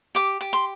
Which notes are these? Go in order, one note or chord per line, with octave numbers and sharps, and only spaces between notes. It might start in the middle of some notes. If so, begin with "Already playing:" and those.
G4 D6
G4
C6